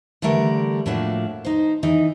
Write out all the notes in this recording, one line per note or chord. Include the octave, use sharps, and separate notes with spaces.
D3 E3 G3 A3 A#4
A2 F3 A3 A#3 D4 F#4
D#4 C5
E3 D#4